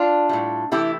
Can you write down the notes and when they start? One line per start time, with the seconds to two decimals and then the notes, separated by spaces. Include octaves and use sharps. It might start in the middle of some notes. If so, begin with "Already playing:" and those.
Already playing: D4 F4
0.29 A2 G3
0.71 C3 E3 A3 E4 G4